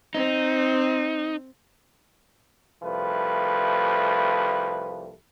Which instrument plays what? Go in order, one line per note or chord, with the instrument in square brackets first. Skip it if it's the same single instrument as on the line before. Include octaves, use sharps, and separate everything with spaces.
[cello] C4 [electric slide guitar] D#4
[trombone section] C2 F3 A3 B4